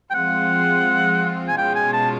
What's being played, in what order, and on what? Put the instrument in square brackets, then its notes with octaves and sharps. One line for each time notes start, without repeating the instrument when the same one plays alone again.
[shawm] G5
[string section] F3 G#3 C4 F4 [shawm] F#5
[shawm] G#5
[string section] B2 G#3 C#4 F4 [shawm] G5
[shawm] G#5
A5